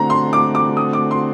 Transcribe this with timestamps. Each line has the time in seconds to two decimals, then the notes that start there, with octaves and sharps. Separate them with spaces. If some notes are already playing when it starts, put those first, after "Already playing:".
Already playing: D3 A3 C4 F#4 A#5
0.10 C6
0.33 D6
0.55 D6
0.77 D#6
0.93 D6
1.11 C6